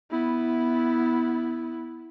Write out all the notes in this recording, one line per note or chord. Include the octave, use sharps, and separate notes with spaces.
B3 E4